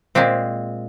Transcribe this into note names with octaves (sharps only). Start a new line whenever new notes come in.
A#2 G#3 C4